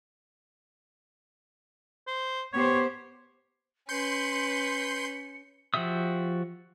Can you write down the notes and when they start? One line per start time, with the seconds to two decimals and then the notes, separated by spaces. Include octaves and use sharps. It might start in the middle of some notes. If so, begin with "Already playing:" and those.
2.07 C5
2.53 B3 G4 C5 C#5
3.89 C#4 B4 C6 G6 C#7
5.74 F3 F#4 G4 E5 D#6